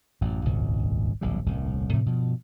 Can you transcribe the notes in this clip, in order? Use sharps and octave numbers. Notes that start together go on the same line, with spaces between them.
A1 F#2
D#1 G#1 C#2
D1 A#1 A2 G3
D#1 C2 A2
A2 C3 F3 A3
G2 B2 F3